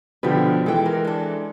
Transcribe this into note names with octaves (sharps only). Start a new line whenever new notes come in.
B2 D3 F3 G4 B4
E3 G#3 A4 G5
A#4
D4 A4